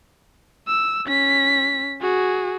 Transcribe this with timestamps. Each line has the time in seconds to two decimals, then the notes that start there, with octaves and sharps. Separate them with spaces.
0.68 E6
1.07 C#4 B6
2.01 F#4 G#4